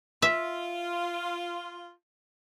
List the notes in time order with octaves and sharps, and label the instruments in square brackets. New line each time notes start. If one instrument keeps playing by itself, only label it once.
[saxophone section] F4 [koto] E5